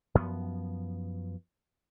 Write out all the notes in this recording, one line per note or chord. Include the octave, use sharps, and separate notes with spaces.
F#2 F3 B3